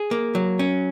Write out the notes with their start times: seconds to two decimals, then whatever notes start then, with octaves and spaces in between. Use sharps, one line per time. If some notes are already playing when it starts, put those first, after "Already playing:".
Already playing: G#4
0.11 A#3
0.35 F#3
0.59 C#4